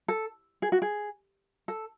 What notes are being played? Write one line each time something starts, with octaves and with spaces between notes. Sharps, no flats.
A4
G#4
F#4
G#4
A4